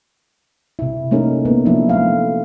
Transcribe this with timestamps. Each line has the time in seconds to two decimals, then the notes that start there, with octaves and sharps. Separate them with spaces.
0.79 C3 E4
1.11 A3 A#3 C#4 D#4 G#4 A#4
1.45 A#3 B3 A#4
1.65 F3 F#3 A#3 D4 E4
1.89 A3 F5